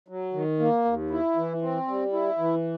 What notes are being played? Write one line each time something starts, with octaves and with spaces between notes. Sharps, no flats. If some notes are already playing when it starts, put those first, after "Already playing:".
F#3
D#3
A#3
D#2
E4
E3
C4
G3
E4
E3